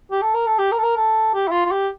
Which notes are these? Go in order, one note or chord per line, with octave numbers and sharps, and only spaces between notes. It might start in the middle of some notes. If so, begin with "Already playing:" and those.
G4
A4
A#4
A4
G4
A#4
A4
A#4
A4
G4
E4
F4
F4
G4